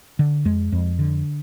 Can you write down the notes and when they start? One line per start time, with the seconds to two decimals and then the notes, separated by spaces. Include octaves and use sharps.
0.19 D3
0.45 F2 G#3
0.72 F2
0.99 D3